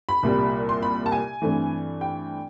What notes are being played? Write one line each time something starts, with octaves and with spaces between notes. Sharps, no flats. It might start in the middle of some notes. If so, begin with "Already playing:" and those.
B5
C2 A#2 G3
C6
B5
A5
G#5
G2 E3 A3 C4
G5